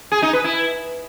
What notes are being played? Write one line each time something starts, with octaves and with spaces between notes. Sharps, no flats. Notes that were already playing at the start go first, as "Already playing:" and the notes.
G#4
D#4
B4
E4